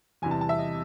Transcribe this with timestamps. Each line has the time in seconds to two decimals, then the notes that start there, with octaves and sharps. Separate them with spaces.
0.22 E2 C3 E3 G3 G#5
0.31 A5
0.41 A5
0.49 E5
0.58 D#5